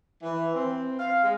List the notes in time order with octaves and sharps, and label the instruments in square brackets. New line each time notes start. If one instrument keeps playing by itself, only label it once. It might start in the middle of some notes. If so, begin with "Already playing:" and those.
[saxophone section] E3
C4
F5
G#3